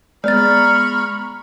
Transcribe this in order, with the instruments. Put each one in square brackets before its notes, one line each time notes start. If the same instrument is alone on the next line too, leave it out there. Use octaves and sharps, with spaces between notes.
[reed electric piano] G#3 B3 [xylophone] D5 A6 [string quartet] A#5 B5 C#6 [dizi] F6